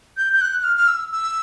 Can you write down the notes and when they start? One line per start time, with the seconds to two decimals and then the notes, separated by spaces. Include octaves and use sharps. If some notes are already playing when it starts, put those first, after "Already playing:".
0.17 G6
0.33 G6
0.41 F#6
0.61 F#6
0.64 F6
0.77 F6
0.88 E6
1.12 E6